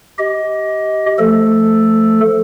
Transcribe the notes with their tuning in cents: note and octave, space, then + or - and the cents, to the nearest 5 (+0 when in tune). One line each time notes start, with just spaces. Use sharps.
G4 -15 D#5 +20
F3 -10 A3 +10 A4 +0